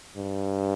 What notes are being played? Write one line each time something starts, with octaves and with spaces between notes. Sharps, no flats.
G2